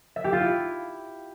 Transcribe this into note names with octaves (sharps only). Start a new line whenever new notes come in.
E5
G4
F4
E4